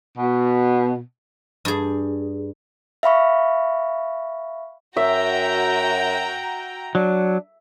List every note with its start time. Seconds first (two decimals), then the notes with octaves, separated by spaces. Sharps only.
0.18 B2
1.65 G2 G#4
3.03 E5 F5 B5 C#6
4.97 F#2 F#4 E5 G5 A#5
6.95 F#3 D4